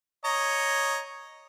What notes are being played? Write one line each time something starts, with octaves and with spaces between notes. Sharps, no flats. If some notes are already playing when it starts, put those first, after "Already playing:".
C#5 D#5 A#5